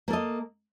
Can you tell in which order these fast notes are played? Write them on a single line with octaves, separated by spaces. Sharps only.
A#3 A4 D#5